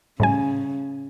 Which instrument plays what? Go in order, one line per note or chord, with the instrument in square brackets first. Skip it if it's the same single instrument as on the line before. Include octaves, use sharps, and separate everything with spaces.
[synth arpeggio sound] A2 G3 G#5 [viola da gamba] C#3